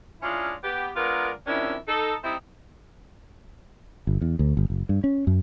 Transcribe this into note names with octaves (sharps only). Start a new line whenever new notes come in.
G#3 C#4 D4 E4 F4
B3 G4
G#3 B3 D4 F4 A#4
F2 C3 D#3 C#4 D4 E4
D#4 A4
G3 C4 D#4 E4
G1
E2
D2
G1
F#1
G2
C#4
F#2